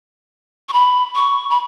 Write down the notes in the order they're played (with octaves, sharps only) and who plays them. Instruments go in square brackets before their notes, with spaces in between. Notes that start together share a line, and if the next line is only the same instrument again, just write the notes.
[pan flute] C#6
B5
C#6
B5